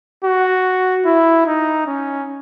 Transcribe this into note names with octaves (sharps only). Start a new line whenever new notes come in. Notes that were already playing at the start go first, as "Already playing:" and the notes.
F#4
E4
D#4
C#4